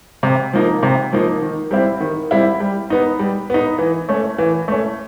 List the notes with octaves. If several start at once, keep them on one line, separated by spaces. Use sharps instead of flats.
C3
F3 A#3 D#4
C3
F3 A#3 D#4
D#3
G3 C4 E4
D#3
G3 C4 E4
G3
B3 D#4
G3
B3 D#4
E3
A3 C#4
E3
A3 C#4